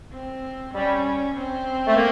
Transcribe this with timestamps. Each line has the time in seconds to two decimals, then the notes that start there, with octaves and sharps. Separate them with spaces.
0.13 C4
0.74 G3 C#4
1.35 C4
1.87 A3
1.96 A#3